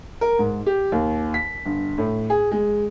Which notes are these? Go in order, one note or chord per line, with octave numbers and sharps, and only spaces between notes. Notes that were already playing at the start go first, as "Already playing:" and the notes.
A#4
G#2
G4
D#2
B6
G1
A2
G#4
G#3